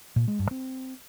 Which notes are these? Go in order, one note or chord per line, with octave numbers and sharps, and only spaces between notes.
A#2
G#3
G2
C4